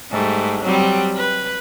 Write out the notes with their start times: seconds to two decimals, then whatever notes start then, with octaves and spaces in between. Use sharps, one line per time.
0.11 G#2 G3 A3
0.63 F#3 G3 C4
1.17 B4